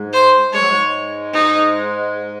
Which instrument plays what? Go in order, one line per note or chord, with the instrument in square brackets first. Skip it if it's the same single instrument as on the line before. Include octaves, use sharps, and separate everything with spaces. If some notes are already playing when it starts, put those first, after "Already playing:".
Already playing: [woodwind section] G#2 G#3
[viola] C5
[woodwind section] G#3 [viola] C#5
[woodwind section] F#3
G#2 G#3
[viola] D#4